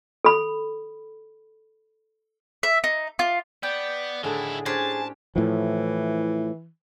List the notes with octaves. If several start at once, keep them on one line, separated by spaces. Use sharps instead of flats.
A4 B5
E5
D#4
F4
B3 D5 G5
A2 D3 D#3 D4 E4 G#4
C#4 D4 G4 G#4 C5 A5
A2 E3 F3